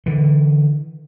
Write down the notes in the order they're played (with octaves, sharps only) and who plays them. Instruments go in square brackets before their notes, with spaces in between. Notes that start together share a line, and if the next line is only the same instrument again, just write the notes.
[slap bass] D3 E3